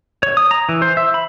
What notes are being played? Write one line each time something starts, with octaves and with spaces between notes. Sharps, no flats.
C#5
D#6
A#5
E3
C5
E5
B5